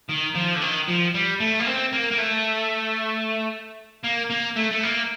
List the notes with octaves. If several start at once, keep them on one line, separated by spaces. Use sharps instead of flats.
D#3
F3
D3
D#3
F3
G3
A3
A#3
C4
A#3
A#3
A3
A#3
A#3
A3
A3
A#3